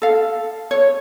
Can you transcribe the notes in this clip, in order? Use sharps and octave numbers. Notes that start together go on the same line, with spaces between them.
A4 F5
C#5